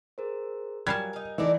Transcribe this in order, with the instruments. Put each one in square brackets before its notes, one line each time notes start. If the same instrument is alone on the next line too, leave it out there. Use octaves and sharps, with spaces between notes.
[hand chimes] G#4 A#4 C5
[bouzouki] F#3 [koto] G3 F4 A5 [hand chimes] A#4 G#5 [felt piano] G#6
[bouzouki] D#4 F5
[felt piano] E3 D#4 [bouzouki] A4 A#4 D5 [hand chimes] E5